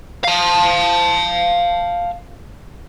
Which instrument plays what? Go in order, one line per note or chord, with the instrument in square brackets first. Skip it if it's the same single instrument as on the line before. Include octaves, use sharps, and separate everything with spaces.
[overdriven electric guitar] F5 A5